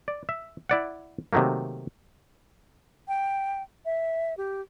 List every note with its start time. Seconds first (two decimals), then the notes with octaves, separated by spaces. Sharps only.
0.08 D5
0.29 E5
0.69 E4 D5 F#5
1.33 C3 D#3 F#3 A3 A#3
3.08 G5
3.85 E5
4.37 G4